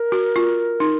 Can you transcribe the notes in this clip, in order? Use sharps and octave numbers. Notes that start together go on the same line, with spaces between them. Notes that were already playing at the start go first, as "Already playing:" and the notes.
Already playing: A#4
F#4
F4
D#4